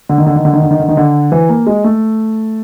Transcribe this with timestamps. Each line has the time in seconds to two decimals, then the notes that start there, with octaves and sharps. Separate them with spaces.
0.09 D3
0.18 D#3
0.26 D3
0.36 D#3
0.45 D3
0.53 D#3
0.62 D3
0.71 D#3
0.80 D3
0.88 D#3
0.97 D3
1.32 E3
1.49 A#3
1.67 G#3
1.84 A3